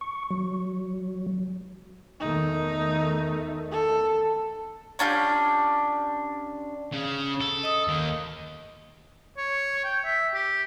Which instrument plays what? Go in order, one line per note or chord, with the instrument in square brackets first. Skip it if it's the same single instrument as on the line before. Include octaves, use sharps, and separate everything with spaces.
[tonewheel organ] C#6
F#3
[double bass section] E2 D#3 A3 [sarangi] D#4
[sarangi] A4
[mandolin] C#4 D4 F4 G4
[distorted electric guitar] C#3
A4
[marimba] D#5 D#6
[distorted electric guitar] D#2 D#3
[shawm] C#5
G5
E5
G4